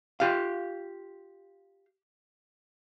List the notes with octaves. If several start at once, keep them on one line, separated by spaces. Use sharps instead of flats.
F4 G4 F5